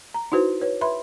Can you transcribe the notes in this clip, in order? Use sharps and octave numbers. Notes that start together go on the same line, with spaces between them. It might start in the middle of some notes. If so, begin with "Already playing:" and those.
A#5
D#4 E4 F#4 B4 C5
B4 C#5
B4 E5 B5 C6